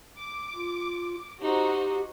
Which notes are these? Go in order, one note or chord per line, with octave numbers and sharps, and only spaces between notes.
D6
F4
D#4 F#4 G4 C5